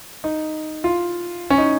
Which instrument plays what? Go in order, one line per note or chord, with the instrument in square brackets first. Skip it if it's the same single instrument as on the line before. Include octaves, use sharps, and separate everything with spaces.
[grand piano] D#4
F4
C#4
D#4